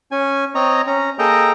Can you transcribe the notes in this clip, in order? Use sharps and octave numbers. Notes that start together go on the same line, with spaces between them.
C#4 G#5
C4 C#5 D#5 A#5
C#4 A#5
A#3 G#4 A4 D#5 G5 A#5